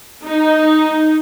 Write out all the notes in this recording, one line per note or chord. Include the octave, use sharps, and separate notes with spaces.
D#4